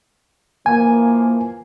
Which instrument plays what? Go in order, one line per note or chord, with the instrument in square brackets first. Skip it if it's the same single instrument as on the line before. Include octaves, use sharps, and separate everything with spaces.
[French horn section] E3 F3 A#3 [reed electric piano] G#5